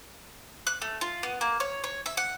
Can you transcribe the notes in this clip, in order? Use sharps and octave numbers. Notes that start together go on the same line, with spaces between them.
F#6
A3
F4
B3
A#3
C#5
C#5
E5
F#5